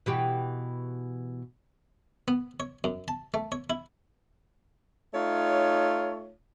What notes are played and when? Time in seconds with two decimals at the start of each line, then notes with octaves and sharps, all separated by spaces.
0.06 B2 E3 G4
2.28 B3
2.60 C#5
2.84 F#2
3.08 A5
3.34 A3
3.52 C#5
3.70 E4
5.13 A3 D#4 F4 C#5